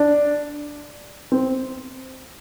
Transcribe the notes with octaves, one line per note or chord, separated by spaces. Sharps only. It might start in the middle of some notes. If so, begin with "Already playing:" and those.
Already playing: D4
C4